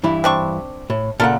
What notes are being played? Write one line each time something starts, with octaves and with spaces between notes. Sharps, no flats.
G2 E3 E4
C4 D4 C#6
A2
A#2 C#3 A4 A#4 F#5